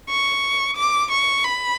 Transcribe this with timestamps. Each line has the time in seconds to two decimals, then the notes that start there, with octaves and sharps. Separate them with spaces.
0.09 C#6
0.77 D6
1.11 C#6
1.44 B5